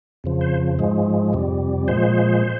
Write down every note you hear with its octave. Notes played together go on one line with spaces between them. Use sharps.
F2 C#3 F3
C5
G#2 F3 G#3
F2 C3 G3
A#2 F3 G#3 C5